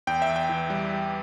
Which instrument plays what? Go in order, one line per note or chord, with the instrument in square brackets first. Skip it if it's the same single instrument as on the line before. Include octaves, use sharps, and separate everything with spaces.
[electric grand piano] E2 G5
E5
E2
G5
E3
G3